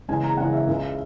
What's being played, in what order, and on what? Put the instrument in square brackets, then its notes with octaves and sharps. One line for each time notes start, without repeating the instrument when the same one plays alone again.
[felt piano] E2 C#3 G#3 G#5
A#5
E2 C#3 G#3 F#5
E5
C#2 C#3 G#3